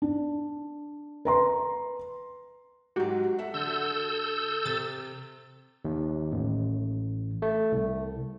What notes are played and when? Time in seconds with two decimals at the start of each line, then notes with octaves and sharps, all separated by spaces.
0.02 D4
1.25 B4 A#5 C6
2.96 G#2 F#3 F#4 G4
3.39 A4 E5 F#5
3.54 D3 A4 E6 G6
4.65 C3 A6
5.85 D#2
6.32 A1
7.42 A3
7.72 C2